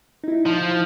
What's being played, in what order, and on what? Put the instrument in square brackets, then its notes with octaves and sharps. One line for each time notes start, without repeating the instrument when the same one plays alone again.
[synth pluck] D#4 E4
[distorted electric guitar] F3